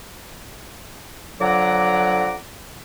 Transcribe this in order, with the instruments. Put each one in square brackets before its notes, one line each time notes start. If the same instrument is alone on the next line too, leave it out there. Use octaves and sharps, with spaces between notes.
[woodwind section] D3 F3 F#3 F#5 A#5 D6